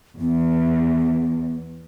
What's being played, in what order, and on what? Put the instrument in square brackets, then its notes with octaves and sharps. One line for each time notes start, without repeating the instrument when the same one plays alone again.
[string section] E2 [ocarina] B3